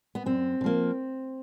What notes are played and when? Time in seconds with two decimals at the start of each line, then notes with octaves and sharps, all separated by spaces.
0.15 B3
0.26 F#2 C4
0.61 D3
0.64 F3 A#3